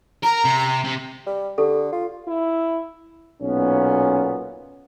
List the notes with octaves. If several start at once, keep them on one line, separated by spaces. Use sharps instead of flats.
A#4 A#5
C3
C3
G3
D3 G4 A4
F4
E4
B1 A#2 B3 C#4